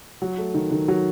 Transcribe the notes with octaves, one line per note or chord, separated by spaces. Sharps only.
F#3
A3
D#3
D#3
F#3